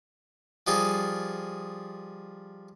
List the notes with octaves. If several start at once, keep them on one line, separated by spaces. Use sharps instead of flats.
F3 G3 D#4 F4 G#4